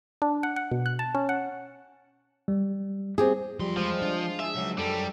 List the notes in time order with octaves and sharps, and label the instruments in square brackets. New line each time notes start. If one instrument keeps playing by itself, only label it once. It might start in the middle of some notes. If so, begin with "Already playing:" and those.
[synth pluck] D4
F#5
F#5
B2
F#6
A5
C#4
F#5
[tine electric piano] G3
[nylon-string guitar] C4 G4 G#4
[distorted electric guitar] E2 C6 [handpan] F3 [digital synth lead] G3
[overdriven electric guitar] F3 [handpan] G#3 C5
[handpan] D4 [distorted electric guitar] F4
[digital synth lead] G#4 [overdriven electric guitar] E5
[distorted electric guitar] C#3 G#3 [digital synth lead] F#3
[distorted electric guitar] F#2 [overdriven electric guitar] G3 [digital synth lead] A4